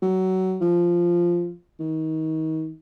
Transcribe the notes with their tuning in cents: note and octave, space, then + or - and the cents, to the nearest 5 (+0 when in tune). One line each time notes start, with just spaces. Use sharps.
F#3 +20
F3 -5
D#3 +30